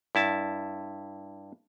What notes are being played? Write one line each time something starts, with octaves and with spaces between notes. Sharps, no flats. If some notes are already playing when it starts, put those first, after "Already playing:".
G2 E4 A5